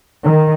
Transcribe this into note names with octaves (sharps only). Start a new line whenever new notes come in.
D#3